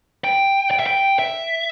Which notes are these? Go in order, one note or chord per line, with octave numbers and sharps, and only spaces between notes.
G5
G5
E5
G5
E5